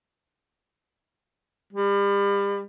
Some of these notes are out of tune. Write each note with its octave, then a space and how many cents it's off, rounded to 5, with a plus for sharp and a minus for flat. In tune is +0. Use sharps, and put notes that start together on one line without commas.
G3 +35